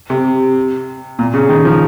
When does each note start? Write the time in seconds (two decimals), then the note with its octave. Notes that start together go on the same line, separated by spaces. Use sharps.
0.10 C3
1.19 A#2
1.34 C#3
1.49 D#3
1.65 F3